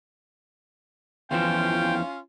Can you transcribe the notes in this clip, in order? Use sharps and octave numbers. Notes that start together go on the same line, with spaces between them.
E2 E3 F3 C#4 F4 G5